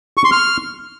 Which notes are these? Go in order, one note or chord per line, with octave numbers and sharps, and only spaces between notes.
C#6
C6
F6